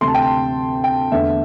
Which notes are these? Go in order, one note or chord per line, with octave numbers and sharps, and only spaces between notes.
D2 C3 A3 C6
A5
G5
A5
G5
E2 D3 A3 E5